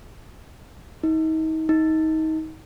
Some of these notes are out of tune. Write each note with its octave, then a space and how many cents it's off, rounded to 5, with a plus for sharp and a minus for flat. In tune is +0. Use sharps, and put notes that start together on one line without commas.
D#4 +35
D#4 +25